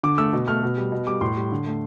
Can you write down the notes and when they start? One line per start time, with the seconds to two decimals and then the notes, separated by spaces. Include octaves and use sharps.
0.03 D3 D6
0.18 A3 E6
0.33 B2
0.48 A3 F6
0.63 B2
0.78 G3
0.92 B2
1.07 G3 D6
1.21 A2 C6
1.37 G3
1.52 D3
1.66 A3